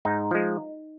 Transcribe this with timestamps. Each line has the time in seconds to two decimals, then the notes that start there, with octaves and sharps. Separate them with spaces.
0.05 G#2 D#4
0.31 F3 G#3